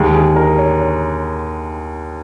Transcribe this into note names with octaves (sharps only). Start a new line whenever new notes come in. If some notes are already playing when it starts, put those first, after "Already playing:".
Already playing: D#2 D#3 G#3
G#4
A#4
C#5
C#5